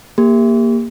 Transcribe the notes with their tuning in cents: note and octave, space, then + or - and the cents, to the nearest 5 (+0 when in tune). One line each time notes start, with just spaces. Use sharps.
A#3 +0 G4 +30